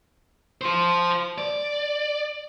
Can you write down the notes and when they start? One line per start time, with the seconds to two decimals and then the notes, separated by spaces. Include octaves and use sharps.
0.61 F4 C5
1.38 D5